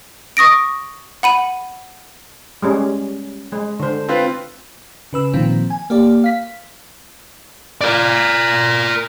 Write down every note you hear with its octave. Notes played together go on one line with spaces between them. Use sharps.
C#6 D#6 A#6 D7
F#5 B5 D#7
G3 G#3 C#4
G#3
D3 C5
C4 F4 B4
C#3 B4 E6
A#2 D#3 F3 C4
G#5
A#3 G4 D5
F5 B6
A#4 D5